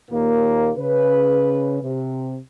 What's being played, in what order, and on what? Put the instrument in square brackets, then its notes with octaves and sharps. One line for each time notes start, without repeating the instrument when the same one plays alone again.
[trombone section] D#2 A#2 A#3
[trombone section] C#3 [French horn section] B4
[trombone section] C3